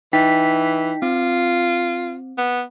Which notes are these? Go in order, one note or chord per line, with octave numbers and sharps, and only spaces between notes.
E3 D#4 G5 B6
C4 F4
B3